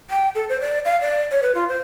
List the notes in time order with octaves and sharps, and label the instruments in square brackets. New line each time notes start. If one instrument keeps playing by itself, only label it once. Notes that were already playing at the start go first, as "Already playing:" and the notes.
[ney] G5
A4
C5
D5
F5
D5
C#5
B4
F4
C5